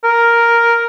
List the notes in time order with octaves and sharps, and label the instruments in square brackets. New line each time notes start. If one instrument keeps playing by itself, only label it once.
[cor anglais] A#4